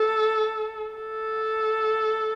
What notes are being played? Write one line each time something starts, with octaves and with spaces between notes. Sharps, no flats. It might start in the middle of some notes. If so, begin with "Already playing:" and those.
Already playing: A4
A4